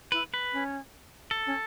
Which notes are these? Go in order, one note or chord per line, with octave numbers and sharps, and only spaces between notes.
E4 B4
B4
C#4
A4
C#4